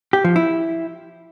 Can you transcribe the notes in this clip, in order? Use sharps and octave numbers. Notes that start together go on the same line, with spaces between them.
G4
F3
E4